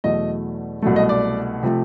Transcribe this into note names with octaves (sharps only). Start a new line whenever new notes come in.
E2 B2 F#3 A3 D#5
C2 B2 F#3 A3
D#5
D5
C3 F3 A3